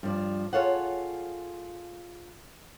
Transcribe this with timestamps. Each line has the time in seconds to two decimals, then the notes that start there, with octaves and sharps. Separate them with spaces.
0.03 G2 F3 D5
0.53 F4 G#4 A4 C#5 F5 F#5